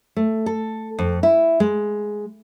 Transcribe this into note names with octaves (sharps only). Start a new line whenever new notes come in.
A3
A4
F2
E4
G#3